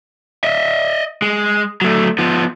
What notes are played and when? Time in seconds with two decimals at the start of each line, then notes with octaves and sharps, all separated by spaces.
0.44 D#5 E5
1.22 G#3
1.81 F#3 A3
2.18 F3 B3